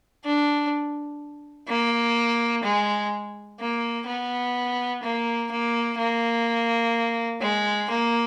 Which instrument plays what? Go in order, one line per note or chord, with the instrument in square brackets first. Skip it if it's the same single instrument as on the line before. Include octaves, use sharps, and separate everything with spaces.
[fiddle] D4
A#3
G#3
A#3
B3
A#3
A#3
A#3
G#3
A#3